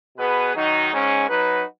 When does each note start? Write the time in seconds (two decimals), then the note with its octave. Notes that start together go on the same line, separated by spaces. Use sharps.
0.17 B2 B3 G#4 B4
0.54 D#3 F#3 D#4 F#4
0.91 G#2 G#3 C#4
1.28 F#3 D#4 F#4 B4